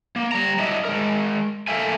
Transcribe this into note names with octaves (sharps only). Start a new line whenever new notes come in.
A#3
G3 A#5
F#3 D4 E4 D#5 E5
G#3 A#4
A3 A#3 A4 E5 F5 G#5